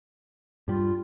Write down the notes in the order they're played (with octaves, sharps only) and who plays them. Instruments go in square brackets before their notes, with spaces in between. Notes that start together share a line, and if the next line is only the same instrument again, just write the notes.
[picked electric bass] G2 G3 [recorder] F4